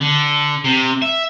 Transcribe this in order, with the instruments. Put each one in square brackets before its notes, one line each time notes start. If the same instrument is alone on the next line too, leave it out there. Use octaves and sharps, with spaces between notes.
[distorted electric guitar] D3
C3
E5